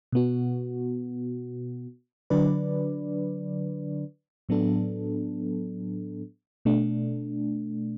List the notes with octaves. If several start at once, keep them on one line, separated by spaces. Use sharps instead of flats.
B2 B3 F#4
D3 F#3 D4 B4 D5
A2 F#3 B3 D4 A4
B2 A3 D4